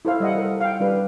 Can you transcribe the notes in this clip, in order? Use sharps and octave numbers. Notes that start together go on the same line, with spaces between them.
E4 A4 C5 F5
G3 D#5 F#5
A4 A#4
F5 G5
G3 D4 B4